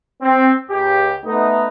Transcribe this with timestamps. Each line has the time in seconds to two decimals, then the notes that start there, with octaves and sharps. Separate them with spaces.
0.22 C4
0.70 C#2 G4
1.24 A3 B3 D#4